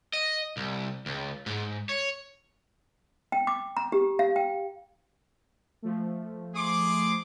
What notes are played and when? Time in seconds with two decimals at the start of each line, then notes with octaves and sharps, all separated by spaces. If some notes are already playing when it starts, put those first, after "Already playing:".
0.13 D#5
0.57 C2
1.06 C#2
1.46 G#2
1.89 C#5
3.32 G5
3.47 D6
3.77 A#5
3.92 G4
4.19 F5
4.36 G5
5.82 F3 A3
6.55 G#4 C6 D6